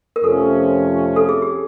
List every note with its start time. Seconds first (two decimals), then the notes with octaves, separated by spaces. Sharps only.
0.16 A#4
0.23 F2 C3 F3 A3 C#4 A4
1.16 A4
1.29 G#4
1.42 G4